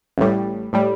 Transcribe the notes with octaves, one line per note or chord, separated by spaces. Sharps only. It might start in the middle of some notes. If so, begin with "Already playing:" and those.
A1 A2 G3
A2 G3